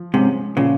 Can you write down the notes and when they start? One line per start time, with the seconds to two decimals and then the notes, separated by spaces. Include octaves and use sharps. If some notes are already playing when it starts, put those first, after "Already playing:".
Already playing: F3
0.14 G#2 C3 G#3 C#4
0.57 A#2 C#3 F3